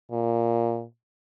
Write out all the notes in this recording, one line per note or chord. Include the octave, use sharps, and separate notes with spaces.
A#2